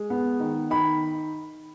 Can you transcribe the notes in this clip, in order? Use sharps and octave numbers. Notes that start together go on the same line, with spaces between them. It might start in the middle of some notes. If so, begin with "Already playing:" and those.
Already playing: G#3
B3
D#3
D#3 B5